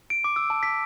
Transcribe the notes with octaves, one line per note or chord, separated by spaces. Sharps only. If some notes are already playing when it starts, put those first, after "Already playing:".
D7
D6
E6
A5
B6